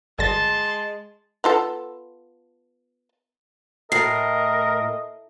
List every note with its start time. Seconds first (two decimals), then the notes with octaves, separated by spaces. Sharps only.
0.19 G1 G#3 A5 C6 A6
1.44 B3 F4 A4
3.92 A2 A#4 D#5 C7